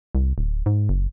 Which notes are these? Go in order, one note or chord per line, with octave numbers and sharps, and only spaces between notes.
C2
D1
G#2
F#1